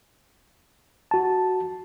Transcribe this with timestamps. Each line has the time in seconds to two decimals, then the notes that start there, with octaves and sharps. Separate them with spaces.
1.11 F#4 A5